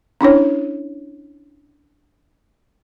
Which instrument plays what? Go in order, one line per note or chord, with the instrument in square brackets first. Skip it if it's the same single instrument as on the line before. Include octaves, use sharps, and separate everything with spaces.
[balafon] C#4 D4 E4 C#5